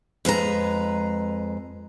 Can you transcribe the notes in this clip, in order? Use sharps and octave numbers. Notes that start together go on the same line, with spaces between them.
F2 G#3 B4 A#5